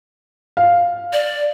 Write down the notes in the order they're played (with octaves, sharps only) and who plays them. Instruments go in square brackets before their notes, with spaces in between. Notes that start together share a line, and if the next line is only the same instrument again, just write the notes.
[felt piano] F5
[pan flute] D5